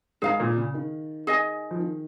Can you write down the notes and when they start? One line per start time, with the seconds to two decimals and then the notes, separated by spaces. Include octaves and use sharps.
0.22 G#2 G#4 F5 A#5
0.40 A#2
0.57 C#3
0.74 D#3
1.27 G#4 D#5 G#5
1.71 F3
1.79 D#3